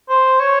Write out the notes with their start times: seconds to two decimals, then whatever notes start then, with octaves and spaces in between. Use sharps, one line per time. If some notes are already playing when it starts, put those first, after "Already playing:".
0.09 C5
0.40 C#5